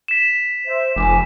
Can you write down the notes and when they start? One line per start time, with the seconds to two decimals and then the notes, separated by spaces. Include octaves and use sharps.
0.08 B6 E7
0.66 C5 E5
0.96 F1 G#5 D6